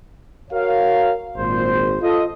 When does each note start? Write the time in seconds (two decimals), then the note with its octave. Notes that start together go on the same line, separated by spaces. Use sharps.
0.51 F#4 A#4 C#5 F5
1.37 G#1 A#2 C5
2.01 F4 A4 D#5